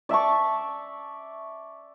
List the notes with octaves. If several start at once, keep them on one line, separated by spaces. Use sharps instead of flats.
D5 E5 A5 C#6